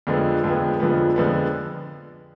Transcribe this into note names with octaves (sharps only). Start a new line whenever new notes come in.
F2 D3 F3 G#3 B3
F2 D3 F3 G#3 B3
F2 D3 F3 G#3 B3
F2 D3 F3 G#3 B3